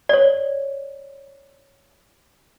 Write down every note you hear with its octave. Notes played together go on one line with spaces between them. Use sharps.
C#5 D5